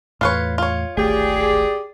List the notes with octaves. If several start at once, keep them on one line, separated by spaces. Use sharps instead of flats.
E2 A2 F4 B4 C#5
F4 C#5
D1 G#1 A3 G4 G#4 D5